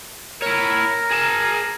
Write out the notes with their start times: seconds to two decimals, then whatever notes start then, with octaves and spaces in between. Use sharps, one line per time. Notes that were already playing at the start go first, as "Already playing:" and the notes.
0.42 E4 A#4 C#5
1.11 G#4 A5